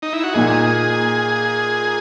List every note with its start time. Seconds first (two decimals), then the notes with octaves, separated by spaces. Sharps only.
0.02 D#4
0.13 E4
0.24 F#4
0.34 A#2 A#3 D#4 G#4